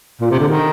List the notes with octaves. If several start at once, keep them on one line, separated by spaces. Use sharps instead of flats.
A#2
C3
D3
D#3